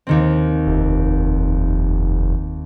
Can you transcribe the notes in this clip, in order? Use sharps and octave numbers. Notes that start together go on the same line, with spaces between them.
D#2 D#3 C4
F1